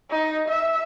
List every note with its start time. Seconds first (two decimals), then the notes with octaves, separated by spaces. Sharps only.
0.11 D#4
0.48 E5